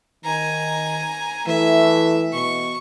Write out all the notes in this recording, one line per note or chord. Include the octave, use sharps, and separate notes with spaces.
D#3 G#5 A#5
E3 A3 E5
B2 C#6